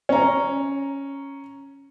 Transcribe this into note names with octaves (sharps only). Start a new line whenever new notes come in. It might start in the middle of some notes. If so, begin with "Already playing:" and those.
C#4 A#5